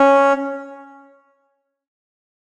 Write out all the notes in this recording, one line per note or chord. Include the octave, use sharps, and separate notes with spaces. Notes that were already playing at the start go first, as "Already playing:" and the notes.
Already playing: C#4